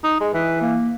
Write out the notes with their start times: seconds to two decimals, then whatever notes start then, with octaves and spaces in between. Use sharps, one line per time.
0.04 D#4
0.20 G#3
0.34 E3 B4
0.61 A#3